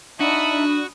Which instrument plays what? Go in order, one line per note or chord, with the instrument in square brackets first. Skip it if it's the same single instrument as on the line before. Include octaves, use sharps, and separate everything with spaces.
[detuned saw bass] D4 [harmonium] D#4 E5 A5 [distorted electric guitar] F#4 [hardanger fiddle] B5 D#6